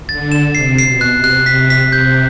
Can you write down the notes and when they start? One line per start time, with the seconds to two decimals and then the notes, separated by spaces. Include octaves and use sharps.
0.09 D3 A6
0.32 E7
0.54 C3 C7
0.79 C7
0.85 B2
1.01 F#6
1.16 C3
1.24 F#6
1.46 C3 B6
1.70 B6
1.92 C3 G6